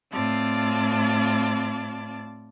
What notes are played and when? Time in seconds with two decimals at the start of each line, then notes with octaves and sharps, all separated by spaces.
0.11 A2 C4 F4 D5 A5